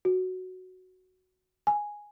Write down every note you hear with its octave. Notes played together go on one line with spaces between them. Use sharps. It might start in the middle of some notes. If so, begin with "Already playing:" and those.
F#4
G#5